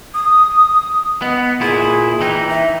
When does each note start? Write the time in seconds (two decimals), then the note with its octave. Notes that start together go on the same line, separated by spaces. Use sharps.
0.14 D#6
1.22 B3 D#5
1.61 A#2 E4 G#4
2.21 E3 D#4 G5
2.50 E5